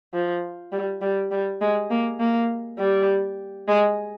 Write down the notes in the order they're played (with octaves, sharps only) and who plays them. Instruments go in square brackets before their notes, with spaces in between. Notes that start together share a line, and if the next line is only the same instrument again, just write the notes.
[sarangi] F3
G3
G3
G3
G#3
A#3
A#3
G3
G#3